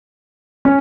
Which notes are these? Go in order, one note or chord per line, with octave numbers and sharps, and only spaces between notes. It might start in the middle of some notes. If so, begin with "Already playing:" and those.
C#4